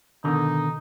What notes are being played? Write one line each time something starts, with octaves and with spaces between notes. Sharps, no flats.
B2 D3 D#3 D#4